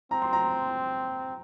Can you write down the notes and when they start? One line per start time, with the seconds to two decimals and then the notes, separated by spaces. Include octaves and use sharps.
0.11 C4 A#5
0.22 C6
0.33 A#5